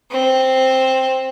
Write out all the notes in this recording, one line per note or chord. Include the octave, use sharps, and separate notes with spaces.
C4